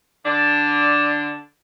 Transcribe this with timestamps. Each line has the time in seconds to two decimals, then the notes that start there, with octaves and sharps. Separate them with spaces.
0.25 D3 D4